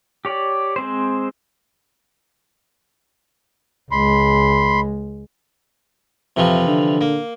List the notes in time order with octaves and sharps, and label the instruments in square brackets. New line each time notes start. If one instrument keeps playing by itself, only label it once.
[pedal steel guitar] G4 C#5 D5
G#3 C4 C5
[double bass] C#2 G#3 [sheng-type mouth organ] B5 C6
[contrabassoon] F2 [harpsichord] C3 E3 F3
[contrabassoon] D3
[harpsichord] A#3